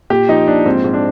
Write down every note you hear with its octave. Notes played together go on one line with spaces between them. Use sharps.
A#2 G4
F3 D#4
A#2 D4
G#2 C4
G#2
D4